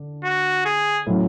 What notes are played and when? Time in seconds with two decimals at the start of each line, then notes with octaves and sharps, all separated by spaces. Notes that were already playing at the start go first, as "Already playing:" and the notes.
Already playing: D3 D4
0.24 F#4
0.66 G#4
1.07 A2 F#3 C#4